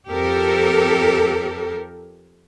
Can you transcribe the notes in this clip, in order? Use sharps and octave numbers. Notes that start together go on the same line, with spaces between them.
F2 G4 A4 A#4